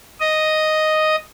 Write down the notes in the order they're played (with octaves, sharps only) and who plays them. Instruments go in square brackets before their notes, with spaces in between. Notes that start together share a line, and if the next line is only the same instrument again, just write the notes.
[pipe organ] D#5